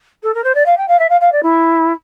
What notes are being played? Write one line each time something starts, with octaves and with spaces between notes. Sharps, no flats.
A4
A#4
C5
D5
F5
G5
F5
E5
F5
F5
D5
E4